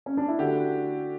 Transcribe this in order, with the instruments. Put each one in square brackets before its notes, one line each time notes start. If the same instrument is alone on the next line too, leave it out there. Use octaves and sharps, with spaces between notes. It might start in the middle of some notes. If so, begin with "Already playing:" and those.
[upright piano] C#4
D4
E4
[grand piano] D3 A3 D4 G4 [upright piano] F#4